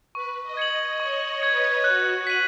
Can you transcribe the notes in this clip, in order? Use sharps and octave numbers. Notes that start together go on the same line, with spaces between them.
B4 C#6
D#5
G#6 C#7 F#7
D#5
C#5 C#6
B4 G#6 C#7 F#7
F#4 F#6
B6 D#7 F#7